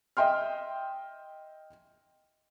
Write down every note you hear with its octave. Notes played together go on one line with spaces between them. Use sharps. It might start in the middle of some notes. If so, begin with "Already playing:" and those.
D#5 E5 G5 C6 F6